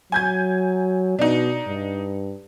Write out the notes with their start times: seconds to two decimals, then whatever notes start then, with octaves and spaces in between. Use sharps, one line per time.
0.12 F#3 G#5 G6 G#6
1.19 B2 D4 D#4
1.67 G2